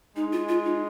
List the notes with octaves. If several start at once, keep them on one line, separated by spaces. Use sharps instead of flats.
G#3 D#4
F4
F4
D#4